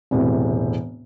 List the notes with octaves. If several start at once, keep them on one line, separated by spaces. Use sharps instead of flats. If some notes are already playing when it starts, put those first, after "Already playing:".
E1 A2 C3